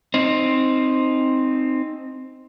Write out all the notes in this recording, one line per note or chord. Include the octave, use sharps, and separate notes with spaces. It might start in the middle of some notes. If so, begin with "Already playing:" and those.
C4 D#4